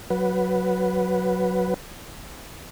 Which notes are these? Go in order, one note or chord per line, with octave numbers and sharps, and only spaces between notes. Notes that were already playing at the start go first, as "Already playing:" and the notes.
F#3 B4